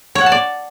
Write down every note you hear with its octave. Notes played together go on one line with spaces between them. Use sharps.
C#5
F#5
A5
D5